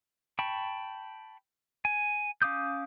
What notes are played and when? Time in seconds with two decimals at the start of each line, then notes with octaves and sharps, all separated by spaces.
0.39 G5 A5 B5 C#6
1.85 G#5
2.42 C#4 F5 D6 D#6 G6